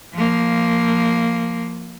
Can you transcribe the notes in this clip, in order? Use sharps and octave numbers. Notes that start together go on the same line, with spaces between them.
F3 A#3